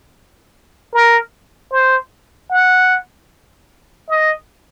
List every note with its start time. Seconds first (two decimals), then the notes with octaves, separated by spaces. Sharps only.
0.94 A#4
1.72 C5
2.51 F#5
4.08 D#5